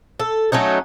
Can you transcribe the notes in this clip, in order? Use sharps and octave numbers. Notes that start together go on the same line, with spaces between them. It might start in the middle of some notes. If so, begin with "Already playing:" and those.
A4
F#3 A3 C#4 D#4